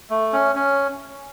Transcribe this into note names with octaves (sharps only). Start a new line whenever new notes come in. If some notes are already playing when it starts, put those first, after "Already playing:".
A3
C#4
C#4